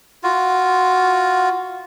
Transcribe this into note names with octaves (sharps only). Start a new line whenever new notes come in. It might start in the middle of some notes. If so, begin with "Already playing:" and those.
F4 F#4